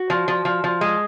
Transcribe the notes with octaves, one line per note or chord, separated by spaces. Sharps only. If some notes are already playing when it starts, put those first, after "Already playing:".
Already playing: F#4
F3
F3
F3
F3
G#3